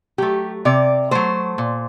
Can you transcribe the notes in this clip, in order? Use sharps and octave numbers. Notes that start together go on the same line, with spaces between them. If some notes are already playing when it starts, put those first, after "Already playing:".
F#3 A3 G4
C3 D5
F#3 A3 C5
A#2